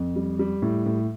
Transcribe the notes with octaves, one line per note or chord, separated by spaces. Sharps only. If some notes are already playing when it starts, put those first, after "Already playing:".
Already playing: F2
G3
G3
A2
A2